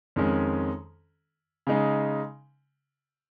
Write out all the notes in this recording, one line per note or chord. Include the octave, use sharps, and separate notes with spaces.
F2 D#3 G#3 C#4
C#3 G#3 D#4